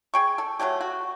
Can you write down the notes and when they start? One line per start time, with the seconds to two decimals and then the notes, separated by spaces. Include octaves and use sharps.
0.14 G#4 G5 C#6
0.38 A4
0.59 F#3 A3 C#4 G4
0.81 F#4